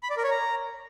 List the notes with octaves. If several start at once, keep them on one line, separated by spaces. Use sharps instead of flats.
B5
D5
A#4
C#5
A#5